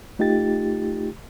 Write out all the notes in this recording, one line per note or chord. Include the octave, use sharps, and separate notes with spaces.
A3 D#4 F4 G4 A6